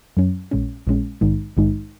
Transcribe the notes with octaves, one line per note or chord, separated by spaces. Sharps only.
F#2 F#3 C#4
A#1 A#2 G#3 C#4
A#1 A#2 G#3 C#4
A#1 G#2 D#3 G#3 D#4
A#1 G#2 D#3 G#3 D#4